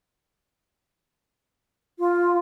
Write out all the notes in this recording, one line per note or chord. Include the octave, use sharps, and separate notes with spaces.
F4